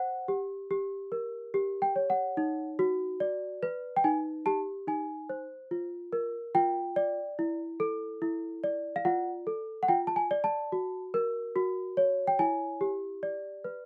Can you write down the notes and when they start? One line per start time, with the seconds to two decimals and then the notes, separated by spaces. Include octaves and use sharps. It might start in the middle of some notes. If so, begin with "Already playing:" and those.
Already playing: C5 F#5
0.28 G4
0.71 G4
1.12 A#4
1.54 G4
1.82 G5
1.96 C#5
2.10 F#5
2.37 D#4
2.79 F#4
3.20 D5
3.63 B4
3.96 G5
4.04 D#4 G#5
4.46 G4 A5
4.87 D#4 G#5
5.29 C5
5.71 F4
6.13 A#4
6.55 F4 G5
6.96 D5
7.39 E4
7.80 A4
8.22 E4
8.64 D5
8.96 F5
9.05 F4 F#5
9.47 A4
9.83 F#5
9.88 F4 G5
10.07 A5
10.16 G#5
10.31 D5
10.44 A5
10.72 F#4
11.14 A#4
11.56 F#4
11.97 C#5
12.27 G5
12.39 E4 G#5
12.81 G4
13.23 D5
13.64 B4